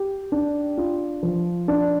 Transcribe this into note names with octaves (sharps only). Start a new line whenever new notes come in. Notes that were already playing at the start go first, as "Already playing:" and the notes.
Already playing: G4
D4
F4
F3
D4